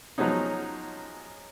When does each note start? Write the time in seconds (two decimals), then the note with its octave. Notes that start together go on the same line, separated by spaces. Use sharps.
0.18 F3 F#3 G#3 B3 C#4 D#4